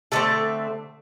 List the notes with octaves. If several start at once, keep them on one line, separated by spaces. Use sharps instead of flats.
D3 A3 C4 A4